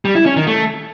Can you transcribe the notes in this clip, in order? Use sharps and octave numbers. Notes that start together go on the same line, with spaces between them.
G3
E4
C#4
D#3
A3